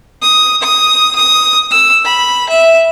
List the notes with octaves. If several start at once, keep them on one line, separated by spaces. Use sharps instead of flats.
D#6
D#6
D#6
E6
B5
E5